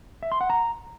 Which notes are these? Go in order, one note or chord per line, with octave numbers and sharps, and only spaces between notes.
E5
C6
F#5
A#5